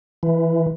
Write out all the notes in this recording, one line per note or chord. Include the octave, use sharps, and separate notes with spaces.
E3